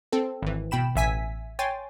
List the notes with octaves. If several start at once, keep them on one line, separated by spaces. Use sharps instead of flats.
C4 A4
G#1 E3
B2 G5 B5 E7
A1 E5 G#5 B6
C#5 G5 G#5 C6 A6